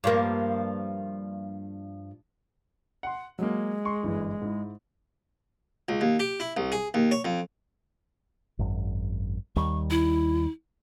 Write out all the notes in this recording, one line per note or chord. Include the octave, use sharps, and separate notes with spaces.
G2 F3 A#3
F#5 C6
F#3 G#3 A#3
C6 C#6
G1 F#2 E3
G#2 E4
C#2
D#2
G4
E4
C2
G#4
D#2
C#5
F2
G#1 F#2
D#2 D#3 G3 C#6
E4